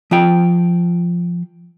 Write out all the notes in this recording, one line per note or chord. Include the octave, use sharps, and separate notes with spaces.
F3 F4 G5